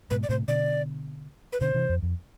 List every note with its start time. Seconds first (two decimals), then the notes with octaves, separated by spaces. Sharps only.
0.10 G#2 B2 B4
0.23 D5
0.29 A2 C3 C5
0.48 B2 D3 D5
1.53 B4
1.61 B2 D3 C5
1.75 C3 E3
1.89 F2
2.03 F2